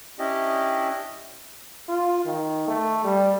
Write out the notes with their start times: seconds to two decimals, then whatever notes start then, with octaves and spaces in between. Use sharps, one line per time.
0.19 C#4 D4 E4 G4 D#5
1.89 F4
2.25 D#3
2.68 A3
3.04 G3